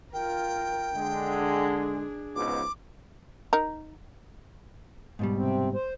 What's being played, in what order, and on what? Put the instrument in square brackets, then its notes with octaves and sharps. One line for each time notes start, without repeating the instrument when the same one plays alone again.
[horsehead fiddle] F4 A#4 [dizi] G5
[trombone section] D3 G#3 [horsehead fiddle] D4 G#4
[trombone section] C#2 G#2 B2 [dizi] D6
[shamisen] D#4 A#4
[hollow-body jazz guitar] G#2 B2 G3
[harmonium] C3 C4
C5